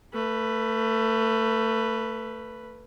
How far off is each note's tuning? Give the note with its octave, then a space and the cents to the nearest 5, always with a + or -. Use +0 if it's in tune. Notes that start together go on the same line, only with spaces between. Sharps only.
A3 +25 B4 +0